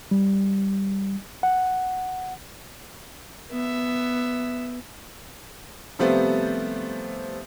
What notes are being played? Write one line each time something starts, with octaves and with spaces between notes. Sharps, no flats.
G3
F#5
B3 E5
C3 F3 G3 A3 B3 C4